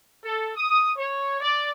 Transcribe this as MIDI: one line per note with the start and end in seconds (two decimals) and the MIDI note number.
0.25 0.51 69
0.56 0.91 87
0.98 1.39 73
1.41 1.70 74